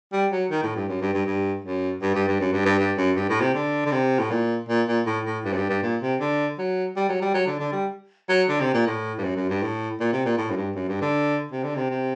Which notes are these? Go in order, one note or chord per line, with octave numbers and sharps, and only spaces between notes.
G3
F#3
D#3
A2
G2
F#2
G2
G2
G2
F#2
G2
G2
G2
F#2
G2
G2
G2
F#2
G2
A2
C3
D3
D3
C3
A2
A#2
A#2
A#2
A2
A2
G2
F#2
G2
G2
A#2
C3
D3
F#3
G3
F#3
G3
F#3
D3
D3
G3
F#3
D3
C3
A#2
A2
G2
F#2
F#2
G2
A2
A#2
C3
A#2
A2
F#2
G2
F#2
G2
D3
C3
D3
C3
C3